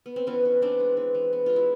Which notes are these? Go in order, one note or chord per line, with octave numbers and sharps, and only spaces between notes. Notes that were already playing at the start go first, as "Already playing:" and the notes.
B3
C4
E3 B3 C#4
E3
B3 C4 D4
G#3
E3
E3
B3
G#3 F4
E4